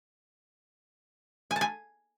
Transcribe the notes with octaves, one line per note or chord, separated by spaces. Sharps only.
G#5
A5
G#5